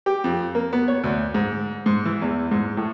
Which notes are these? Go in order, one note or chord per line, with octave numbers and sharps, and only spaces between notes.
G4
F2
A#3
B3
C#5
D2
G#2
G#2
E3
E2
G#2
A2